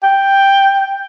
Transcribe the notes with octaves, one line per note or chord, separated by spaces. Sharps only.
G5